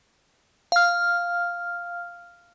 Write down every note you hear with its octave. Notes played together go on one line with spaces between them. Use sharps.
F5 F6